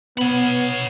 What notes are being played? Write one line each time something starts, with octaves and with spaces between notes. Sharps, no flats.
B3 C#5 B5